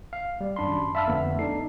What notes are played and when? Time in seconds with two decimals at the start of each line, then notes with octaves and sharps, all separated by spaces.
0.13 F5
0.40 G3
0.56 G#1 F#2 D4 B5 C6
0.95 E5 F5 A5 B5 E6 F6
1.08 F2 D3 A3 B3
1.39 D4 D#4 A4 C7